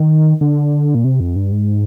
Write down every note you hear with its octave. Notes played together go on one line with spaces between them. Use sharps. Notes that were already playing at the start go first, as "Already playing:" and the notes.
Already playing: D#3
D3
A#2
C3
F2
G2
G#2